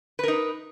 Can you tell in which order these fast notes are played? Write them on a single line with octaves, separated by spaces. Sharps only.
B4 A#4 D#4